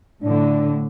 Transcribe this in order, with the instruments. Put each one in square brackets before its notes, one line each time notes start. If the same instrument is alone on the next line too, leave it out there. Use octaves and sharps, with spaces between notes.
[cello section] A2 D3 [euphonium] D4